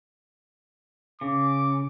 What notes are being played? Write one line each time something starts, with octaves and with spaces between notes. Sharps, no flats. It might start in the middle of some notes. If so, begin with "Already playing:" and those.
C#3 D6